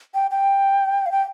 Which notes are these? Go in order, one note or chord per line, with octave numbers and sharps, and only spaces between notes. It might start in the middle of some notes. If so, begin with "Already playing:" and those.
G5
G5
F5
G5